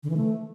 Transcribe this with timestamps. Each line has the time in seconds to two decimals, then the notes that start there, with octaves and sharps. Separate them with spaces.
0.03 D3
0.10 E3
0.17 A3